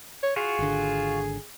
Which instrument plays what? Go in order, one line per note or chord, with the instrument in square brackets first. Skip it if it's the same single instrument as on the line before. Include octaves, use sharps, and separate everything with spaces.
[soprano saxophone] C#5
[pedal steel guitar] F4 F#4 [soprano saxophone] G#4
[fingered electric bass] G#1 D3